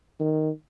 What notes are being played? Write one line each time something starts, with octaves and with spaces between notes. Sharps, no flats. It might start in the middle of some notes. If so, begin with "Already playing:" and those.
D#3